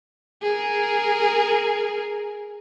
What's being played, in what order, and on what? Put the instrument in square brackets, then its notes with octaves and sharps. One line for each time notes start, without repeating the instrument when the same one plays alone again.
[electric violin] G#4 A#4